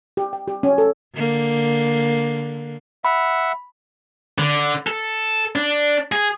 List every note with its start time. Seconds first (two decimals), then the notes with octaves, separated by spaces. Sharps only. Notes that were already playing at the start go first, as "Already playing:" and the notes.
0.17 G4
0.33 G5
0.48 G4
0.63 C#4
0.78 A4
1.14 D3 A#3
3.05 E5 F#5 B5
4.38 D3
4.87 A4
5.55 D4
6.12 G#4